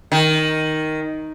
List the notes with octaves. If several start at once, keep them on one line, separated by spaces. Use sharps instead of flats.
D#3